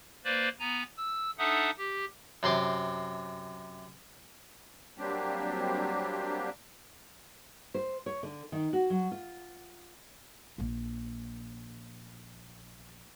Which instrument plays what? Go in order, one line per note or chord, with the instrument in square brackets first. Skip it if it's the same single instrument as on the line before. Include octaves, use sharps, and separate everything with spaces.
[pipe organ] A#3 B4 C5 D5
B3 G#5 A#5
E6
D4 D#4 A4 E5 F#5 D#6
G4
[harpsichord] F#2 C3 C6 D6
[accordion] F#3 G3 A#3 C4 D4 G4
[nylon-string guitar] C5
C#5
D3
D#3
F#4
F#3
F4
[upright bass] A#1 A#3